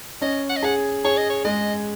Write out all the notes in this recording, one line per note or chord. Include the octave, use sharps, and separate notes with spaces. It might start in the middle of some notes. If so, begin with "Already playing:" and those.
C#4 D#5
F#5
D#5
G#4 F#5
G#4 C#5
D#5
C#5
G#3 D#5